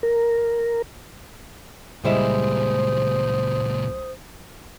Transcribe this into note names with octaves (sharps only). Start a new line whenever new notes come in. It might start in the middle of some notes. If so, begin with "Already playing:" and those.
A#4
C#2 A#2 G3 G#3 E4 C5 D#6